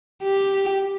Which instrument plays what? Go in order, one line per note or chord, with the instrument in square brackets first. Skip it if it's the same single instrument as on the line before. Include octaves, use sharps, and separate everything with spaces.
[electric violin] G4